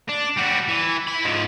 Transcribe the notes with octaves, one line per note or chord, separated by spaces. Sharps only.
D4
G3 F#4
E3
E4 B5
G#2 F3